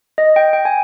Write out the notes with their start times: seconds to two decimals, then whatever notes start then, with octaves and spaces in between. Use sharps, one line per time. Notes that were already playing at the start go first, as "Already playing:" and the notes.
0.18 D#5
0.36 G5
0.53 G5
0.65 G#5